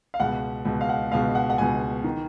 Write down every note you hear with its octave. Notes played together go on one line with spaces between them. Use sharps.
F5
C#2 B2 F#5
C#2 B2
F5
F#5
C#2 B2 F5
F#5
F#5
C#2 B2 G#5
D#3